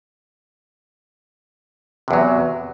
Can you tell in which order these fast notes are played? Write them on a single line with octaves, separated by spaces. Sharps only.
C3 E2 F#3